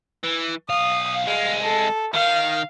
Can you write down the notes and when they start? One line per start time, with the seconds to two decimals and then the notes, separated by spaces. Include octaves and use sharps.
0.24 E3
0.69 B1 F5 D#6
1.27 C2 G#3 F5
1.63 A4
2.14 D#3 F5